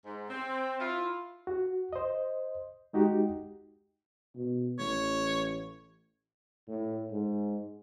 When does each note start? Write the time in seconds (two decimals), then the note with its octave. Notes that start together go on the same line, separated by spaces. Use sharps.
0.05 G#2
0.29 C4
0.79 E4 F4
1.47 F#4
1.93 C5 D#5
2.93 G#3 D#4 F#4 G4
4.36 B2
4.79 A1 C#5
6.68 A2
7.11 G#2